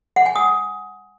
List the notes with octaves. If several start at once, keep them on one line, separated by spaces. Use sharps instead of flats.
F#5
G#5
D#6